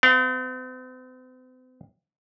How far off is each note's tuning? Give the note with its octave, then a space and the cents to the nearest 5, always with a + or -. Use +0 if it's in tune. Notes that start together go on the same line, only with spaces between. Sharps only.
C4 -45 F5 +15